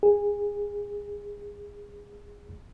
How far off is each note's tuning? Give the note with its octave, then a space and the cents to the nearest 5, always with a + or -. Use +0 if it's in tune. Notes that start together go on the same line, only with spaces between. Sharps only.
G#4 -20